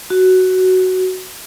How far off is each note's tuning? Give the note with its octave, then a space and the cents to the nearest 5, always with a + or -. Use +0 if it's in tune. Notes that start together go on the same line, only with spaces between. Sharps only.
F#4 +10